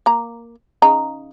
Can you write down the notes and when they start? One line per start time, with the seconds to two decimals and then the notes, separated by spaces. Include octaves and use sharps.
0.06 A#3 A#5
0.82 C#3 D#4 A#5